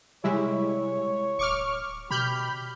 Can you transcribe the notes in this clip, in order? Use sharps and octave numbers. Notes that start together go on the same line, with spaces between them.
C3 G3 G#3 E4 C#5
D1 C#6 D6 F6
B2 G4 B5 F6 G6